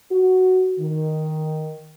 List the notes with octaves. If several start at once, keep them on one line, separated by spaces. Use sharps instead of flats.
F#4
D#3